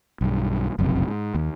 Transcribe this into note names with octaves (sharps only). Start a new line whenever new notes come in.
B1 G2
F#1 B1 F2 C3
G#2
D#2